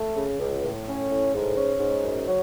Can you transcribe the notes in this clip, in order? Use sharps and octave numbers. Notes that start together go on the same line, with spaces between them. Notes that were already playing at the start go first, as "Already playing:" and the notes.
Already playing: A3
C#3
C#2
A2
C#4
A2
G#2
C#4
G#2
F#2
F#3